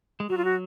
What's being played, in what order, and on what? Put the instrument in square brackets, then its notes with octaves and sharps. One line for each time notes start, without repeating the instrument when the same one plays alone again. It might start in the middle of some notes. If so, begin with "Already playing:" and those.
[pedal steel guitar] G#3
[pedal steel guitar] F#3 [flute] F#4
[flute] F4
F#4